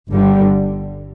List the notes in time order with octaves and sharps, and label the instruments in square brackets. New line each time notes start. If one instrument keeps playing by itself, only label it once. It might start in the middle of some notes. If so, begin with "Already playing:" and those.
[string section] G1 G2 D3 G3